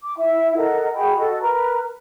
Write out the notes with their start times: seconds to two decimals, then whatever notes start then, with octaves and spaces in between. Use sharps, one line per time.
0.03 D6
0.17 E4 E5
0.56 A4 A#4 D#5 F#5
0.94 F#4 G#4 G5 B5
1.17 F#4 A4 D#5
1.41 A#4 B4 A#5